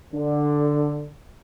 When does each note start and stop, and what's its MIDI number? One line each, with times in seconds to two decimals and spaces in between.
0.13 1.09 50